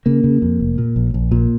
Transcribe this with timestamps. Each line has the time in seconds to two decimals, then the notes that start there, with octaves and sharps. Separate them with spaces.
0.06 C#3 A#3
0.24 C#3
0.42 F2
0.60 F1
0.78 A#2
0.96 A#1
1.14 A#1
1.32 A#2